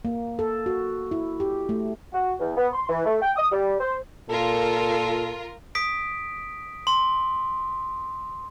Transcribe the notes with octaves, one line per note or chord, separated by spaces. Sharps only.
A#3
A4
F#4
E4
G4
A3
F#4
E2
B3
C6
E3
A3
G5
D#6
G3
C5
A#2 F4 A4 A#4
D#6 B6 D7
C6